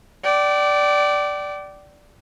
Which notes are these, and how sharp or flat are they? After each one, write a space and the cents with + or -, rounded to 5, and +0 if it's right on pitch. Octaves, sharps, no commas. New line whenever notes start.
D5 +0 G5 -35